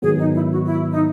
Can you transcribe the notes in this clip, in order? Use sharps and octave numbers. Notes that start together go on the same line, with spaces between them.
G#2 D#3 F#3 B3 G#4
D#4
E4
F#4
E4
D#4